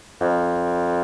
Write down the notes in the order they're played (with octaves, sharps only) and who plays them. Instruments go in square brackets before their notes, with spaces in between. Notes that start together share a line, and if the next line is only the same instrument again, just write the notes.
[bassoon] F2